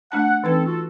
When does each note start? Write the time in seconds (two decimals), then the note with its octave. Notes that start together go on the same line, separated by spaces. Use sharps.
0.12 A3 D4 F#5 A5
0.44 E3 C4 C#4 D#4 A4 B4
0.65 F4 F#4 A4